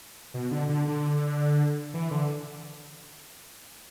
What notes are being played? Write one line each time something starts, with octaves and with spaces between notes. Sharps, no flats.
B2
D3
D3
D3
E3
D3